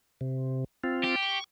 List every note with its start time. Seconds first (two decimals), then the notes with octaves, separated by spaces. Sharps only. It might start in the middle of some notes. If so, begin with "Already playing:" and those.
0.21 C3
0.84 C4 F4
1.04 G4
1.22 C#6